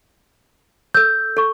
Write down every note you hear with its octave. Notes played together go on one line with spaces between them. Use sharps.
A4 E6 G6
A4 C#6